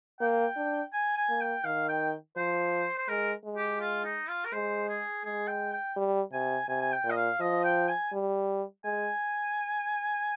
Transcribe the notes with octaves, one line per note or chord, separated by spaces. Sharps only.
A#3 G5
D4
G#5
G#5
A#3
G5
D#3 F5
G5
F3 C5
C5
G#3 A#4
G#3
G4
F4
D#4
F4
A#4
G#3 C5
G#4
G#3 G#4
G5
G5
G3
C3 G#5
C3 G#5
G#5
G5
A#2
D#5
F5
F3 D#5
G5
G#5
G3
G#3 G#5